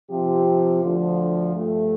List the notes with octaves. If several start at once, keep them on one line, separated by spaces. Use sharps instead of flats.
C3 F3 C4 G4
D2 D3 F3
G2 F3 A3